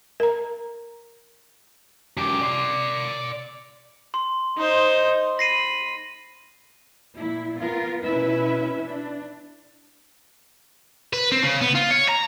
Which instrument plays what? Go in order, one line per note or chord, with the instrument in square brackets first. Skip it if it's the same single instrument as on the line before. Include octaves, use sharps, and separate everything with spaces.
[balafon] A#4 A#5
[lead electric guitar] F#2 G4
D5 C6
[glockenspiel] C6
[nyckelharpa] D#4 C5
[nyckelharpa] B5 [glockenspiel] A#6 C7 D#7
[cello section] A#2 E4
B3 F4 A#4
B2 C#4 E4 B4 E5
D4
[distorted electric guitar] B4
C4
C#3
B3
F4
C#5
A#5